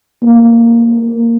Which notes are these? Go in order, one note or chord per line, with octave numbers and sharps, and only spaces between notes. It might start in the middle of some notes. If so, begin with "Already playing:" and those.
A#3